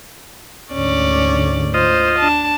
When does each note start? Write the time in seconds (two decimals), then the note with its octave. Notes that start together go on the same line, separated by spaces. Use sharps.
0.72 D2 G#2 D3 C#4 D5
1.74 F4 C5 D#5
2.19 D4 A5